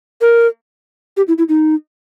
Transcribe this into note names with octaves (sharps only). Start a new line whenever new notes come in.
A#4
G4
E4
E4
D#4